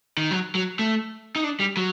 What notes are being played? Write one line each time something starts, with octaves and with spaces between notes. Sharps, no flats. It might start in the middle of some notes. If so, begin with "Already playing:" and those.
D#3
F#3
F#3
A3
D#4
D4
G3
F#3